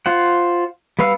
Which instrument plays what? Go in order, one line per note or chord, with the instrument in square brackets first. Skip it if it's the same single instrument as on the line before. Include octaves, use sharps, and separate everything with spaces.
[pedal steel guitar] F4 C5 F#5
G3 B3 B4 F5 E6